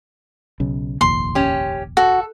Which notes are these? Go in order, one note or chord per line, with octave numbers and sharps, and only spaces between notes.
B1 C#3
F1 A#1 D#2 C6
C#4 G4
F#4 A4